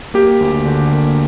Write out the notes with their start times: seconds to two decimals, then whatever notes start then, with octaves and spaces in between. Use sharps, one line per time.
0.14 A#3 G4
0.41 D2
0.66 D3
0.92 A#3